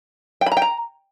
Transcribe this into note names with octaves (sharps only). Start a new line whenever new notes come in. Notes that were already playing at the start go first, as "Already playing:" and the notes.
G5
B5
A#5
G5
A#5